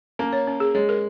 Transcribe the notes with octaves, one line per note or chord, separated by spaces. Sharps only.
A#3 C#4
C#5
C#4
G#4
G#3 C#5
A#4